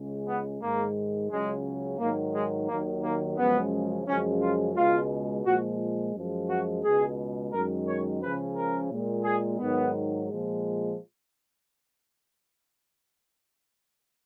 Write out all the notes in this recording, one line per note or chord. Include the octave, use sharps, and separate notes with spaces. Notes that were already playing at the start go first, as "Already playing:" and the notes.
Already playing: C#2 C#3 G#3
B3
G#2 D#3 G#3 A#3
C#2 C#3 F#3 G#3
G#2 D#3 F#3 A#3
G#3
D#2 D#3 F#3 A#3
A#3
F#2 C#3 F3 G#3 B3
F#2 C#3 F3 G#3 C#4
F4
C#2 B2 G#3 F4
A#2 F3 G#3 F#4
F#2 F3 G#3
F#4
C#2 B2 G#3 G#4
F#2 D#3 G#3 A#4
C#5
C#2 C#3 F3 B4
A#4
A#2 G#3
G#4
G#2 D#3 F#3 B3
A#2 F3 G#3